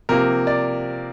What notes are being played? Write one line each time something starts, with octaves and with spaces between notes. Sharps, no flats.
C3 F3 A#3 A#4
D5